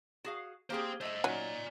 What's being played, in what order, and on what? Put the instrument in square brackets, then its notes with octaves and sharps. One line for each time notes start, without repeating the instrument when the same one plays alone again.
[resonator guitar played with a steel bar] F#4 G#4 F5
[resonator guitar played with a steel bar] A#3 G4 G#4 [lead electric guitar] C5 G5
[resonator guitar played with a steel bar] A3 E5 [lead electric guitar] C5 D#5
[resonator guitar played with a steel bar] A#2 C#4 D#4 [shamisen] F#3 [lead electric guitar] D5 G#5